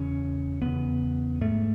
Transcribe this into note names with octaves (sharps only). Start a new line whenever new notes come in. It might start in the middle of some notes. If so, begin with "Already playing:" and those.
Already playing: E2 C#3 C#4
E2 C#3 B3
G#2 A3